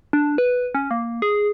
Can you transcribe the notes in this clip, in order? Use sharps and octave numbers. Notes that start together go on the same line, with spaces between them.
D4
B4
C#4
A#3
G#4